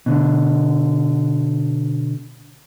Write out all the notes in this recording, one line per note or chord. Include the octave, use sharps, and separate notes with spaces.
B2 D3